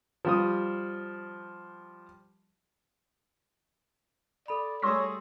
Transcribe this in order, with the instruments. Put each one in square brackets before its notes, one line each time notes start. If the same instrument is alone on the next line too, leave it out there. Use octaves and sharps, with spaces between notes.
[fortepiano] F3 G3 D#6
[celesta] A4 B5 [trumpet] D5
[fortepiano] G3 A3 G#4 [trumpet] C#5 [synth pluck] C6 E6 A#6